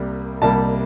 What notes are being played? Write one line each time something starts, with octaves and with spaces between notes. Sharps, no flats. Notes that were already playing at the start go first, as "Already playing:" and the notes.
Already playing: C2 C3 G3 A#3
C2 C3 G3 A#3 A5